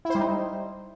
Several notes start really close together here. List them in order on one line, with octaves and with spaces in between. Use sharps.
E4 C5 G3 D#4